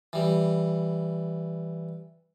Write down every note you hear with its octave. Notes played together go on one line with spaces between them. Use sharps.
E3 G3